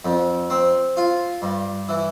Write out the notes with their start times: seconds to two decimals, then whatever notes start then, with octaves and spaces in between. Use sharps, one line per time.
0.05 F2
0.50 C4
0.97 F4
1.42 G2
1.89 E3